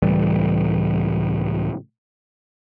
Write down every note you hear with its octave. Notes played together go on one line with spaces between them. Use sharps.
C#2 A2 E3 G3